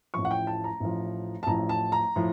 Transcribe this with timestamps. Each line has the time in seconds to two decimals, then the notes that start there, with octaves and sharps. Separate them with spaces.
0.14 A1 A2 F3 C#6
0.25 F#5
0.31 G5
0.47 A5
0.64 A#5
0.80 A1 A2 F3
1.43 A5
1.47 A1 A2 F3 A#5
1.69 A5
1.92 A#5
2.16 A2 F3